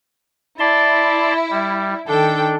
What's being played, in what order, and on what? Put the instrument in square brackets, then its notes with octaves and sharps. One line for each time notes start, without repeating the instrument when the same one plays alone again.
[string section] E4 [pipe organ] D5 A5 C6
[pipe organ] G3
[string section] D#3 A4 G5 [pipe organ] D4